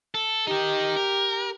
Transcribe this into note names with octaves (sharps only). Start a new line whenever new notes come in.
A4
D#4 G4 A#4
A#4